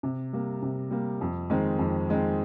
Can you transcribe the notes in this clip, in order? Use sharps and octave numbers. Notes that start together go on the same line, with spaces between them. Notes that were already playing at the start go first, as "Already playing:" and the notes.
C3
G3 A#3
C3
G3 A#3
F2
D#3 G#3 C4
F2
D#3 G#3 C4